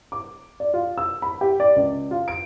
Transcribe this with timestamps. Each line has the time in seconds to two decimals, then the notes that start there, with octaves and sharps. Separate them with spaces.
0.12 D6
0.60 D5
0.74 F4
0.98 E6
1.22 B5
1.41 G4
1.60 D5
1.76 C#2
2.11 F4
2.28 D7